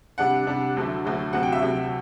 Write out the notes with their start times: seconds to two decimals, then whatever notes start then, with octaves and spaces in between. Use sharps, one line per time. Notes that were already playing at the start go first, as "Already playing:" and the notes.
0.18 C3 G3 D4 F#5
0.47 C3 G3 D4
0.77 D2 D3 F#3 A3
1.05 D2 D3 F#3 A3
1.33 D2 C3 F#3 C4 F#5
1.43 G5
1.52 E5
1.62 D2 C3 F#3 C4